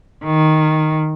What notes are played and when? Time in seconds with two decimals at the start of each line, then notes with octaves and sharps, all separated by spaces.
0.24 D#3